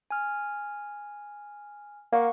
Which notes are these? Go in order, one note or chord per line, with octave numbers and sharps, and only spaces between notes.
G#5 F6
A#3 F5 F#5 C#6